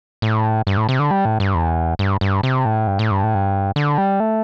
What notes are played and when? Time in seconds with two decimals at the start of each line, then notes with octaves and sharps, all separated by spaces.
0.22 A2
0.67 G2
0.77 A2
0.89 C3
0.99 D3
1.11 G3
1.25 A2
1.40 G2
1.55 E2
1.99 G2
2.21 G2
2.43 C3
2.65 A2
2.87 G2
2.99 A2
3.11 G2
3.23 A2
3.35 G2
3.76 D3
3.98 G3
4.20 A3